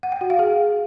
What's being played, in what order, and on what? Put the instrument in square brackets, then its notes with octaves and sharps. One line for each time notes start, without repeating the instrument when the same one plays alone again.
[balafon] F#5
G5
F#4
F5
G#4